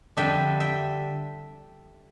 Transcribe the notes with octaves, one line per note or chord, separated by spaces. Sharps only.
F2 D3 G3 D4 E5 G5
E5 G5